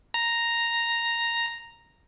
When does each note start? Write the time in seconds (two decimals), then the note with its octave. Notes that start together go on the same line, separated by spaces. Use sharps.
0.14 A#5